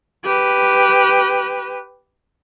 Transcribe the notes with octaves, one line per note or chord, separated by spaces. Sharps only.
G4 B4